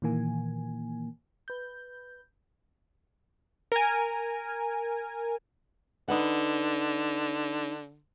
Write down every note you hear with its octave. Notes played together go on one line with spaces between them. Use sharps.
A#2 D#3 E3 A#3 G#5
B4 G6
A#4 G#5
D3 D#4 B4 F#5